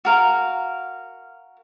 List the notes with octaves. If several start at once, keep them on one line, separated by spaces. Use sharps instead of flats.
F#4 A#4 F5